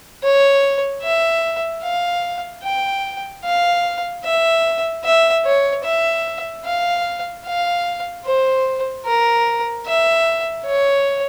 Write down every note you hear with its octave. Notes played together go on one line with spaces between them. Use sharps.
C#5
E5
F5
G5
F5
E5
E5
C#5
E5
F5
F5
C5
A#4
E5
C#5